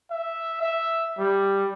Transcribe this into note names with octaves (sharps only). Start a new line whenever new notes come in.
E5
E5
G3